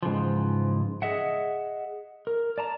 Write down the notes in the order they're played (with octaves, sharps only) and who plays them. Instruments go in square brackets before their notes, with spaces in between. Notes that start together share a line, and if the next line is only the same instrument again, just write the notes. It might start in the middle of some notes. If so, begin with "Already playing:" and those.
[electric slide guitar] G#2 C#3 E3 F3
G#4 D#5 E5 F#5
A#4
D5 A5 A#5